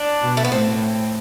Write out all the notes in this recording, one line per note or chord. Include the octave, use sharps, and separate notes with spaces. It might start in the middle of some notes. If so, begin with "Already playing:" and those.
Already playing: D4
B2
A3
B3
A2 C4